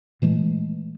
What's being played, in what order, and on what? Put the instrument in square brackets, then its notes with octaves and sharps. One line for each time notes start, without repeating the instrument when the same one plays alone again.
[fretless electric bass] A#2 E3 G#3 A3